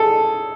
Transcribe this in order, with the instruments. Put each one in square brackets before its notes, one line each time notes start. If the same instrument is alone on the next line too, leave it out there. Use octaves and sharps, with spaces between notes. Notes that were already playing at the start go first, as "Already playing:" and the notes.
Already playing: [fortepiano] G#4 A4